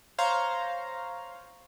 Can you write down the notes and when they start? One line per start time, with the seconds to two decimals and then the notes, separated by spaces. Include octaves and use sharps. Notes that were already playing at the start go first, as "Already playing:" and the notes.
0.18 C5 C#5 F5 A#5 C6